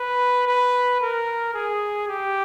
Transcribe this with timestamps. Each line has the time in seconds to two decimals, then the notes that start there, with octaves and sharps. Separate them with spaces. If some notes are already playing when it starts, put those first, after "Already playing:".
Already playing: B4
0.47 B4
1.01 A#4
1.54 G#4
2.08 G4